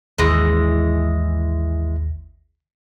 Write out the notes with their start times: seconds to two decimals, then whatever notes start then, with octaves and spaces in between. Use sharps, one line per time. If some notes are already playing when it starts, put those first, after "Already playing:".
0.18 G#1 D#2 E3 G#3 A#6